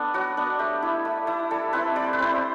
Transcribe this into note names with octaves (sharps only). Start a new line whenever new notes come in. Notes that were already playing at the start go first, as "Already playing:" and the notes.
Already playing: B3 D4 A4
F#3 F#4
B3 D4
A3 G4
E4
A3
E4
G3 A4
C4 E4 B4
G3 D5
C5
B4
C4 E4 C5